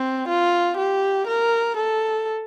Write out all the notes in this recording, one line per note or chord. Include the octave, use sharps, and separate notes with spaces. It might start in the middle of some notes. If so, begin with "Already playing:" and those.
Already playing: C4
F4
G4
A#4
A4